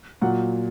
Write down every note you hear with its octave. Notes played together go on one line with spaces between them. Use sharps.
A#2 F#3 F#5